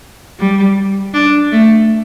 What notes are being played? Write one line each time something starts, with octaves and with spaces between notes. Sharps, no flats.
G3
D4
A3